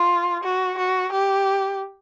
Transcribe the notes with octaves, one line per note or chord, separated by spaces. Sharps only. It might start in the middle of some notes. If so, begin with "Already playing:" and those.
Already playing: F4
F#4
F#4
G4